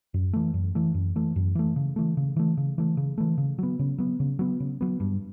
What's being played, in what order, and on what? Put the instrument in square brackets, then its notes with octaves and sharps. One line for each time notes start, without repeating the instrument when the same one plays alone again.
[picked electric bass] F#2
E3 A3
F#2
E3 A3
F#2
E3 A3
F#2
E3 A3
C#3
E3 A3
C#3
E3 A3
C#3
E3 A3
C#3
E3 A3
C#3
F#3 B3
C#3
F#3 B3
C#3
F#3 B3
C#3
F#3 B3
G2